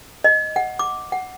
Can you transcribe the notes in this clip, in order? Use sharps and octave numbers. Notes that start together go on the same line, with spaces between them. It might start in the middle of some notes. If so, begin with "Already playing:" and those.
D#5
F#5
D6
F#5